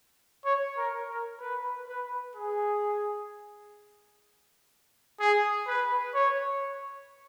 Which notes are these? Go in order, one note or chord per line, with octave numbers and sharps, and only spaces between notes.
C#5
A#4
A#4
B4
B4
G#4
G#4
B4
C#5